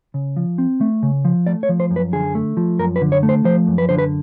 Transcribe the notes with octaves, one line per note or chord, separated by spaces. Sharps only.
C#3
F3
C4
A3
C#3
F3
A3 D5
C#5
F3
C5
F#2
B4
D3 G#4
A3
F3
F#2 A#4
B4
D3
C#5
A3
C5
F3 C5
F#2
B4
D3 C5
B4